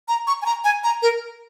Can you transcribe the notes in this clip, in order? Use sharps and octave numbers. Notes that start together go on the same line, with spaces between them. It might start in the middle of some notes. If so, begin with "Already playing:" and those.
A#5
C#6
G#5
A#5
G#5
A#5
A#4